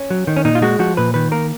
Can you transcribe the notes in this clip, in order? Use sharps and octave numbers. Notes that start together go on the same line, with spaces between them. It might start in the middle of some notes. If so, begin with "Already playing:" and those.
Already playing: C#4
F#3
D#3
C#4
A#2 D#4
F4
G#3 F#4
F3 F#4
A#2 B4
D#3 B4
A#3 A#4